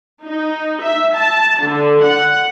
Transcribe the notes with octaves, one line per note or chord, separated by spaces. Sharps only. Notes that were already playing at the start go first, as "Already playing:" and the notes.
D#4
E5
A5
D3
F#5